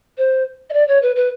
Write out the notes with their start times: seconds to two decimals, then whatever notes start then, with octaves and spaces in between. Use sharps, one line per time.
0.18 C5
0.70 D#5
0.73 D5
0.88 C#5
1.02 B4
1.16 B4